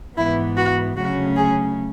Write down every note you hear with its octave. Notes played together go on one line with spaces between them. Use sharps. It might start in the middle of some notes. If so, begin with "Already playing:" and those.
G#2 E3 B3 E4
F#4
D2 C#3 F#3 A3 C#4 F#4
G#4